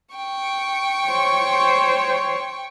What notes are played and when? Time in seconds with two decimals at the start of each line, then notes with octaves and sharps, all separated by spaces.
0.16 G5 C#6
1.10 C5 C#5